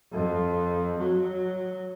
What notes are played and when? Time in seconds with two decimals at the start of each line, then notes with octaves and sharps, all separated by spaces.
0.12 F2
0.98 F#3